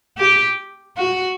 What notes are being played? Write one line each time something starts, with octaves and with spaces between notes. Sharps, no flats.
G4
F#4